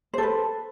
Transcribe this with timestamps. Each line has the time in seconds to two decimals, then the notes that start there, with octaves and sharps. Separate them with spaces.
0.14 C5
0.18 A4
0.23 B4